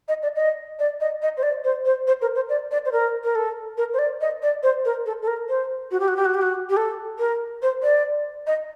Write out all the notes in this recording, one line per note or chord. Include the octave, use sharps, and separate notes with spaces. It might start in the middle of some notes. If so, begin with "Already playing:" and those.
D#5
D5
D#5
D5
D#5
D#5
C5
D5
C5
C5
C5
A#4
C5
D5
D5
C5
A#4
A#4
A4
A#4
C5
D5
D#5
D5
C5
A#4
A4
A4
A#4
C5
F#4
G4
F#4
G4
F#4
G4
F#4
G4
A4
A#4
C5
D5
D#5